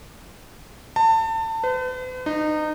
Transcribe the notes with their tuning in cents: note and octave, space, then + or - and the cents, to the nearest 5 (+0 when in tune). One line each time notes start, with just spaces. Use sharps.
A5 +30
B4 +45
D#4 -25